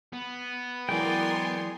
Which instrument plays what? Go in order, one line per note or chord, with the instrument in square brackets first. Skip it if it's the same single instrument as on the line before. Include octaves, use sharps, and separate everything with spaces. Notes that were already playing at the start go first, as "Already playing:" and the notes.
[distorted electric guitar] B3
[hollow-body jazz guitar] E3 F#3 G#3 [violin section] A#4 G#5 C6 [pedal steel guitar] D5 G5